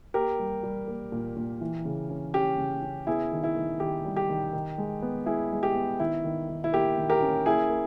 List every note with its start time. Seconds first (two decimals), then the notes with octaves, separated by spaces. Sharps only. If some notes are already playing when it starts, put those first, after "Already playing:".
0.14 A#3 G4 A#4
0.39 G3
0.63 G3
0.88 A#3
1.12 A#2
1.37 A#2
1.61 E3
1.85 C#3
2.10 C#4
2.34 C#4 G4
2.58 C#3
2.82 C#4
3.07 B3 E4 G#4
3.32 D#3
3.44 E4
3.56 D#3
3.80 D#3 G4
4.05 G3
4.16 G4
4.29 D#3
4.53 D#3
4.78 G#3
5.02 B3
5.26 G#3 E4 G#4
5.52 G#3
5.63 G4
5.75 B3
6.00 D#3 E4
6.24 D#3
6.49 D#3
6.64 E4
6.72 A#3 G4
6.98 D#3
7.10 G4 A#4
7.22 C#4
7.46 A#3 E4 G#4
7.70 A#3